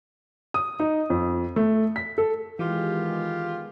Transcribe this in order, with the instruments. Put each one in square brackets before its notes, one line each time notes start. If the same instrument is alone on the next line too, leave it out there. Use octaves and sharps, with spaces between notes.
[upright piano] D#6
D#4
F2
A3
B6
A4
[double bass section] D#3 G#3 B3 [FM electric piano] E3 [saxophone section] F4 G4